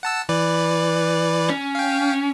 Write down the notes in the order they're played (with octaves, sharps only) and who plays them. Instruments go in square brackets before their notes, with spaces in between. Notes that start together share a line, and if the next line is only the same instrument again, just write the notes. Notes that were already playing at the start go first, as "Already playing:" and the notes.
[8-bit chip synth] F#5 A5 E6
E3 B4 D5
[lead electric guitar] C#4
[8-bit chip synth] F5 G5